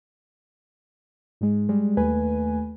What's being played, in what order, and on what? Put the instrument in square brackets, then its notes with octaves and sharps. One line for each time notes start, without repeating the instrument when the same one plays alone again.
[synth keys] G#2 G#3
G3 G#3
D#2 A3 B4 G#5